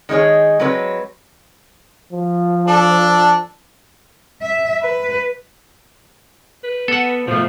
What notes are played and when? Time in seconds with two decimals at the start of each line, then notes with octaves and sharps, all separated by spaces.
0.09 D#3 G#3 D#4 G#4 C#5
0.59 F#3 G#3 C4 B4 C#5
2.13 F3
2.67 D4 A4
4.41 E5
4.82 B4
6.64 B4
6.88 B3 A4 F#5
7.27 B2 F3 A3